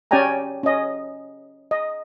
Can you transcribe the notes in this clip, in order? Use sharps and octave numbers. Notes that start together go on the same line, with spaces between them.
C#4 G4 D5 G5 G#5 A#5
C#4 D#5
D#5